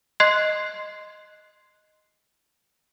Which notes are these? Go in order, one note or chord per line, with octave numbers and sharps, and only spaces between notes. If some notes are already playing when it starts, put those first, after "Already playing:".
D#5 C6 F#6 G#6 C7